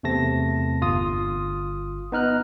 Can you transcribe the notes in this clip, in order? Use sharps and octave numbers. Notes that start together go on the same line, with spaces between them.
E2 C3 A3 C4 A5 A#6
G1 F4 D#6
B3 D#4 F6 F#6